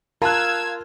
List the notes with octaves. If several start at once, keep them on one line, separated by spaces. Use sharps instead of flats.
F4 A#4 F5 A5 E6 F#6 G#6